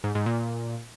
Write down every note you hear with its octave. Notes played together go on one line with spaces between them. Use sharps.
G#2
G#2
A#2